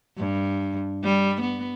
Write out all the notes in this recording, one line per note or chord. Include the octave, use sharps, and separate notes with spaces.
G2
G3
B3